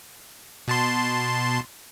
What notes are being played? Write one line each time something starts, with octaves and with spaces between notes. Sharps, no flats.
B2 A5 C6